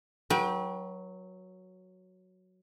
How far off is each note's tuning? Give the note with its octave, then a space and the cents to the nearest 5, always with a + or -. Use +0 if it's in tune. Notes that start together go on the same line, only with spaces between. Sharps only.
F#3 +0 B4 -40 G5 +5